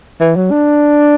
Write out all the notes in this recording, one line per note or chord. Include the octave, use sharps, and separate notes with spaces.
E3
F#3
D4